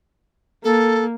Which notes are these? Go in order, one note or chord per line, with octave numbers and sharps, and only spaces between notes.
A#3 A4